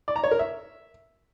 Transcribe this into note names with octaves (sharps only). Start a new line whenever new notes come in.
D5
A#5
C#5
A#4
E5